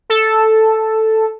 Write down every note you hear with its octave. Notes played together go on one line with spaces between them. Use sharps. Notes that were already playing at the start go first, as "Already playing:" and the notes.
A4